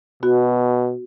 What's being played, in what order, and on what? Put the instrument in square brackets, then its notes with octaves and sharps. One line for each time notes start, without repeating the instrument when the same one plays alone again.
[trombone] B2 [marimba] B3 F#4